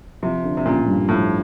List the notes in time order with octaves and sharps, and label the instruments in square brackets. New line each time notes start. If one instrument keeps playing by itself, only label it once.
[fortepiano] C3 [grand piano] F3
[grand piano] D3
[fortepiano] C3
[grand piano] A1 [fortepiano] A#2
[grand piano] G2
[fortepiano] A2 [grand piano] F3